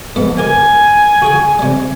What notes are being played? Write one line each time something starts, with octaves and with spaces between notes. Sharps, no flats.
G#2 F3 B3
G4 A#4 G#5
F#4 G#4 G5
C3 G3